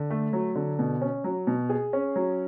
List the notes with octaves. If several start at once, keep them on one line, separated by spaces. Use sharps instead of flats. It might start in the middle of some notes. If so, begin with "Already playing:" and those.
Already playing: D3
A3
F#3
D3
B2
C#4
F#3
B2
G#4
C#4
F#3